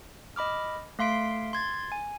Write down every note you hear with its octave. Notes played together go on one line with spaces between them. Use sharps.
D#5 B5 D6 F6
A3 F5 C6 B6 D7
C6 G#6 A6
G#5